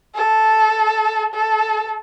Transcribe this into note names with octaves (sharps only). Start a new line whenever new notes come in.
A4
A4